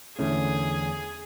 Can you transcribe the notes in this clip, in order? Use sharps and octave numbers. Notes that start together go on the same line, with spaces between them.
E2 D3 A3 C#4 E4 G#4